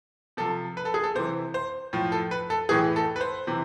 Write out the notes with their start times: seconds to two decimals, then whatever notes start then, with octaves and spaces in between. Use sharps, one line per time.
0.37 C3 F3 A4
0.77 B4
0.85 A4
0.94 G#4
1.04 A4
1.15 C3 E3 C5
1.54 C5
1.93 A2 F3
2.12 A4
2.31 B4
2.50 A4
2.69 A2 E3 G#4
2.96 A4
3.16 B4
3.21 C5
3.47 C3 E3